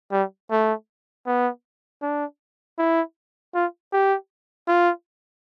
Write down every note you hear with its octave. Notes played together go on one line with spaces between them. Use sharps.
G3
A3
B3
D4
E4
F4
G4
F4